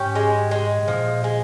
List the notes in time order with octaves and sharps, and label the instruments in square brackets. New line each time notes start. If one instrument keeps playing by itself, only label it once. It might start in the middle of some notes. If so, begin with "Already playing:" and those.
Already playing: [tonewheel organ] G#2 [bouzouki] C#4 G4
[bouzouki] G#3
G#3
[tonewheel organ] G#2
[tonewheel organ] A#2 [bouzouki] F3
[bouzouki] G#3